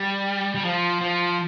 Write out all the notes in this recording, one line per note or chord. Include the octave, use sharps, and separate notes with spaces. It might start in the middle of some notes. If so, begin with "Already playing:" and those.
Already playing: G3
G3
F3
F3